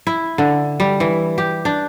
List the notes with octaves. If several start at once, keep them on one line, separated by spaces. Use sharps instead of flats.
E4
D3
G3
E3
G4
D4